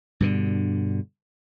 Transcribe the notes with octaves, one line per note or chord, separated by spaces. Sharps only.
G2 B2 D3